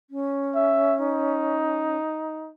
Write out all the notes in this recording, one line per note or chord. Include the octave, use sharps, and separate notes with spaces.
C#4
E5
D#4